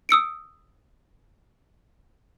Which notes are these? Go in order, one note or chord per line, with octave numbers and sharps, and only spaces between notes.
D#6 E6 C#7 D7